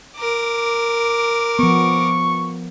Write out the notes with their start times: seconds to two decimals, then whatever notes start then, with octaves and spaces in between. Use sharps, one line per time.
0.16 A#4 D6
1.59 F3 B3 C#6